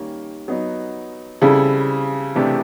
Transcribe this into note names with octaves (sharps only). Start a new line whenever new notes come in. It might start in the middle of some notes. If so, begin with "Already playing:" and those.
Already playing: D#3 G3 A#3 C#4
F#3 B3 D#4
C#3 G3 C4 E4 A4
C3 E3 A3 D4 G4